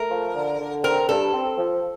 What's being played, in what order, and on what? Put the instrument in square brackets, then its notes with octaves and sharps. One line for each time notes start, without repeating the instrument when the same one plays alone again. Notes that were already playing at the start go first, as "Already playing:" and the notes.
Already playing: [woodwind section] A3 [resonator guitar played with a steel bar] A#4
[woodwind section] F3
D3
D3
[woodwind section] C4 [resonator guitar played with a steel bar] A#4
[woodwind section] G2 [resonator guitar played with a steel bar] A4
[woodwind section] C4
F3